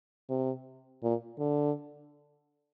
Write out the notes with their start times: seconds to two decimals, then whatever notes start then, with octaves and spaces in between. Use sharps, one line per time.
0.30 C3
1.03 A#2
1.39 D3